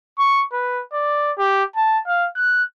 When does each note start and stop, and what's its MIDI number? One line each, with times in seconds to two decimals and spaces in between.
0.19 0.43 85
0.52 0.82 71
0.93 1.31 74
1.38 1.64 67
1.76 2.00 81
2.07 2.27 77
2.36 2.63 90